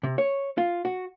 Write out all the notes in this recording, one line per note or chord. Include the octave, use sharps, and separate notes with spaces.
C3
C#5
F4
F#4